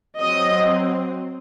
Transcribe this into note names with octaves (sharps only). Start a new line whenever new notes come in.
F#3 C4 D#5